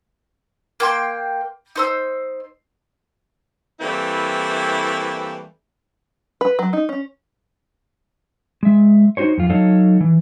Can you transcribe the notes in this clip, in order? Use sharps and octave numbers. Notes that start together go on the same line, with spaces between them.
A#3 G5 C6
D#4 C5 E6
E3 G3 A3 A#3 C4 E4
B4
F#3
D#4
C#4
G#3 E5
D#4 F#4 C5 C#5
F2 F4
F#3 D#4 A4 C#5 D#5 F5
E3